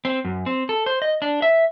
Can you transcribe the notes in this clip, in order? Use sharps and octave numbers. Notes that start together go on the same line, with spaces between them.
C4
F#2
C4
A4
C5
D#5
D4
E5